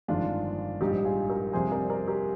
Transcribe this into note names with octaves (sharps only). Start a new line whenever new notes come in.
G1 F2 D#3 G#3 D4 F4
A#1 G#2 G3 D#4 G4
F4 G#4
G4 A#4
F2 C3 G3 G#4 C5
A#4 D5
A#4 D5
G4 A#4